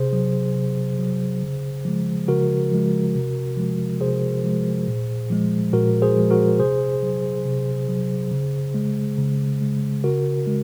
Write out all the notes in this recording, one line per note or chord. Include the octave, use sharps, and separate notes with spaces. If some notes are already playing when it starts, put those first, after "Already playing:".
Already playing: C3 G#4 C5
F#3
C3
F#3
C#3
F3 G#3
C#3 F#4 A#4
F3 G#3
C3
F3 G#3
C3 G#4 C5
F3 G#3
A#2
F3 G#3
A#2 F#4 A#4
G#4 C5
F3 G#3
F#4 A#4
C3 G#4 C5
F#3
C3
F#3
C#3
G#3
C#3
G#3
C#3 F#4 A#4
G#3